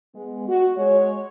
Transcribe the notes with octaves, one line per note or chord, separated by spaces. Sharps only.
G#3 B3
F#4
G#3 C#5